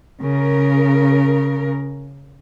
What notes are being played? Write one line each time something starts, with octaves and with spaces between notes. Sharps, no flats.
C#3 A#4